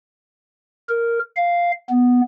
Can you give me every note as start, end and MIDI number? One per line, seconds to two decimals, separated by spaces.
0.89 1.19 70
1.36 1.71 77
1.90 2.21 59